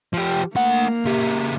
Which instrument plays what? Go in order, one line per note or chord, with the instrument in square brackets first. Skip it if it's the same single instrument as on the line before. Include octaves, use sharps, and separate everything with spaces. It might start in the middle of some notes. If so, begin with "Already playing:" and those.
[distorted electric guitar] F3 G4
[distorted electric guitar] A3 F#5 [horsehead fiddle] A#3
[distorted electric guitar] C#3 G4